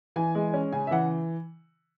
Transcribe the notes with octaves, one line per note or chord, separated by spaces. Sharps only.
E3 G#5
G#3
C#4
C#3 G#5
E5
E3 F#5